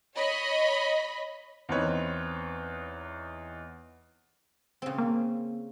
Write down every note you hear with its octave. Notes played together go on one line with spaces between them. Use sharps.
C#5 D#5 B5
E2 C4 D#4 B4 C#5
C#3 C4
A#3